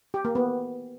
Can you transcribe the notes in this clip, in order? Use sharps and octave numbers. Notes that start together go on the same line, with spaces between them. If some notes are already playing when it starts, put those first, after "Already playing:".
G4
A#3
B3